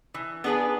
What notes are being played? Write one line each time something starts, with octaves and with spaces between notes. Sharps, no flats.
E3
B3 D4 G#4 B4